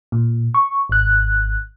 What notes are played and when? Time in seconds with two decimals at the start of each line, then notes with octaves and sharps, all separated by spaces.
0.12 A#2
0.54 C#6
0.89 G#1 F#6